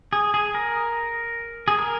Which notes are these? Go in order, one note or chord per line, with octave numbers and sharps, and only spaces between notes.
G#4
G#4
A#4
G#4
A#4